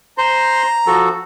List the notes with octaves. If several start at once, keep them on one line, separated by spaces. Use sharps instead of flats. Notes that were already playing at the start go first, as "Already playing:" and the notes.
C5 A#5 C6
F3 F#4 A4